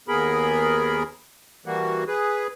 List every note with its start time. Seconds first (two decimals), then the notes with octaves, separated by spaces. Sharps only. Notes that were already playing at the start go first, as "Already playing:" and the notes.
0.08 D#2 B3 G#4 A#4 B5
1.66 E3 G3 A#3 F#4
2.07 G#4 B4